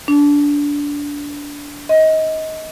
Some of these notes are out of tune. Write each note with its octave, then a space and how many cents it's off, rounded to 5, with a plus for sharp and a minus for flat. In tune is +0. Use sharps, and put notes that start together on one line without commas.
D4 -20
D#5 +25